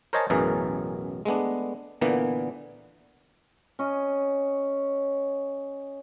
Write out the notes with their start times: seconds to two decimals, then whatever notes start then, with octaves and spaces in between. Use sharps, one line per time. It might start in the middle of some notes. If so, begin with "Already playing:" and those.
0.13 A#4 C5 C#5 D#5 G#5 A5
0.30 A1 F#2 B2 E3 G#4 A#4
1.25 G#3 A3 B3 D4
2.01 A#2 D3 E3 A#3 B3
3.79 C#4 D#5